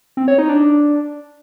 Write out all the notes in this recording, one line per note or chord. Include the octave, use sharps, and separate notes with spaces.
C4
C#5
D#4
D4